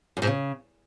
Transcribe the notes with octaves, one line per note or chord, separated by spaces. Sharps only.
F#2
G#2
C#3